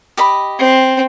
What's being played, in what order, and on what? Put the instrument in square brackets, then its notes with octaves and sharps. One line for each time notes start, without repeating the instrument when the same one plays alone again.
[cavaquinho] G4 D#5 B5
[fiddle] C4